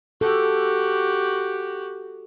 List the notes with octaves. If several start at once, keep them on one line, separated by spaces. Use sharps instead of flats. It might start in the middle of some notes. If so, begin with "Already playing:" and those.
F#4 G4 A4